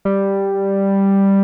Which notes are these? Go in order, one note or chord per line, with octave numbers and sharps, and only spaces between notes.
G3